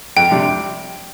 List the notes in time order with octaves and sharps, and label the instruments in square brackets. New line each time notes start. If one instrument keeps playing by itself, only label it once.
[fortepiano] F2 [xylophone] G5
[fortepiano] C3 G3 D4